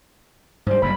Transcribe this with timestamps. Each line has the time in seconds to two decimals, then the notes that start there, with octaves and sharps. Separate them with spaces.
0.66 G#2 G3 C5
0.82 F#1 G#2 G3 B5